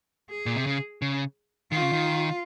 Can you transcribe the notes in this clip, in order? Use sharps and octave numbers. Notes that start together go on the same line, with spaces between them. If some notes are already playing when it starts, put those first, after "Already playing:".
G#4
A#2
C3
C#3
C#3
D#3 F4
C#3
D#3